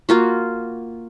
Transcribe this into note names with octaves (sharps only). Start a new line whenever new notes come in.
A#3 F4 F#4